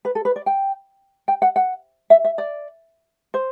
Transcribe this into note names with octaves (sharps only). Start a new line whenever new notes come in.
B4
A4
B4
D5
G5
G5
F#5
F#5
E5
E5
D5
C5